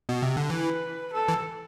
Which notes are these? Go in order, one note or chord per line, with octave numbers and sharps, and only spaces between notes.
B2
C3
D3
E3 B4
A4
E3